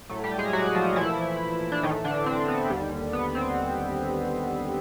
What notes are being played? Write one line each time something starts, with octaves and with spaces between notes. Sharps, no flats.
A2 F#3 A3
G3 G4
G#3 G#4
F#3 F#4
F3 F4
A#2 E3 F3 A3 E4
D4
A2 D#3 E3 A3 D#4
D3 D4
C4
B3
D#2 D3 G3
B3
C4